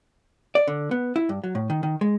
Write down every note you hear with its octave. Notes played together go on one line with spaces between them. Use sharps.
D5
D3
B3
E4
G2
F#3
A2
D#3
D#3
G#3